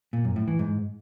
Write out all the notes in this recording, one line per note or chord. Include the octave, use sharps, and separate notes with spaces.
A#2
F#2
A2
E3
G#2